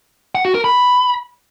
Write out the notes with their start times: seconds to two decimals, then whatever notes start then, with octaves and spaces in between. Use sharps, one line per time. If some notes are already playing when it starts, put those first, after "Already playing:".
0.35 F#5
0.45 F#4
0.55 A#4
0.64 B5